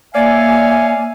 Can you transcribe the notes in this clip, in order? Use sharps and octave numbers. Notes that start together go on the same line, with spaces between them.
A#3 C#5 D5 E5 F5 G#5